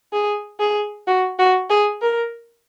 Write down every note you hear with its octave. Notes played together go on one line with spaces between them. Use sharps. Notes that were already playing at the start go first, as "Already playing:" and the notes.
G#4
G#4
F#4
F#4
G#4
A#4